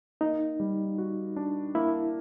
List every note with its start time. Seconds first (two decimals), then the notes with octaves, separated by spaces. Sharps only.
0.21 A#3 D#4
0.60 G3
0.98 F#4
1.36 D4
1.75 A#3 E4